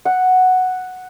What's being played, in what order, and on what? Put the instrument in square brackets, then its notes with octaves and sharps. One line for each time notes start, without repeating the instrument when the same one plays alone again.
[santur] F#5